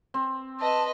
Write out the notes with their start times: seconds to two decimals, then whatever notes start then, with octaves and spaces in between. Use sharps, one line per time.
0.14 C4
0.60 B4 D#5 A5